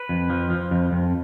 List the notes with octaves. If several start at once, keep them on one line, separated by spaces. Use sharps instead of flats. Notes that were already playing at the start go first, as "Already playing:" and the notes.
Already playing: B4
F2
F3
F3
F2
F2